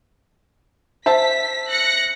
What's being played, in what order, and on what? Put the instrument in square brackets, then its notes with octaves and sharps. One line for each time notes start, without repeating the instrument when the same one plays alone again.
[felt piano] C5 E5 A5 [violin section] B6
[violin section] F#6 A#6 C#7